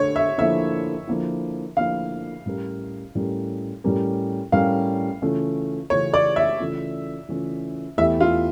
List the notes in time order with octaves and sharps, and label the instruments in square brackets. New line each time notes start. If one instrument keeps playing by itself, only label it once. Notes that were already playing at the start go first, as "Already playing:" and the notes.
Already playing: [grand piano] D3 [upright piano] C#5
[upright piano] E5
[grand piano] D3 F3 A#3 E4 [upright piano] E5
[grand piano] D3 F3 A#3 E4
[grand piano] D3 F3 A#3 E4 [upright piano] F5
[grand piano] A2 G3 C#4 G4 A#4
A2 G3 C#4 G4 A#4
A2 G3 C#4 G4 A#4
[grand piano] A2 G3 C#4 G4 A#4 [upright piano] F5
[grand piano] C#3 E3 A3 C#4 F4
[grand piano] C#3 E3 A3 C#4 F4 [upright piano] C#5
[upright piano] D5
E5
[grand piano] C#3 E3 A3 C#4 F4
C#3 E3 A3 C#4 F4
[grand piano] E2 E3 A3 E4 G4 [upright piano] E5
[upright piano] F4